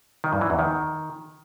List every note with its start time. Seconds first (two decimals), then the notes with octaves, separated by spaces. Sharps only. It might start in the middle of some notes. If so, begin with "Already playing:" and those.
0.24 D#3
0.33 G2
0.41 E3
0.50 E2
0.59 D#3